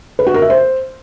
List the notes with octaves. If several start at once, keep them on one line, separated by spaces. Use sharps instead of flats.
B4
F#4
A#4
E5
C5